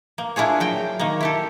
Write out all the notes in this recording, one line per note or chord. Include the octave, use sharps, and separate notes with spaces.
A#3
D4 E4 F4 G#4 C#5
F#3 G5
D#3 A#3
E4 G4 A4